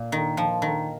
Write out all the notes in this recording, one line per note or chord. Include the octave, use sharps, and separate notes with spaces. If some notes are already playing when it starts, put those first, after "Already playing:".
Already playing: A#2
D#3
F3
D#3